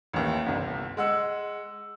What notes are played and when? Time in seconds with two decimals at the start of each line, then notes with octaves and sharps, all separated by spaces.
0.13 A1 D#2
0.46 G1 C2
0.97 G#3 F#5 E6